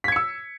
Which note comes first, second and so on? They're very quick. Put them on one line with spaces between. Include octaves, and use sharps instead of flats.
B6 G#6 C#7 E6